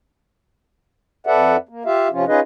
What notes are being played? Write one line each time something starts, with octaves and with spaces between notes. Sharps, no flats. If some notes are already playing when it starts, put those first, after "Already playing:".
F2 A4 B4 D5 E5 F#5
A#3
F4 G4 E5 F5
C3 F3 C#4 F4
C#4 D#4 F4 G#4 B4 D#5